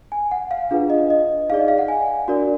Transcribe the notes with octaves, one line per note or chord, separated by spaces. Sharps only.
G#5
F#5
F5
D4 F4 G#4 B4 F5
D#5
D#5
D#4 G#4 D5 F5
D#5
F5
F#5
G#5
D4 F#4 A#4 D5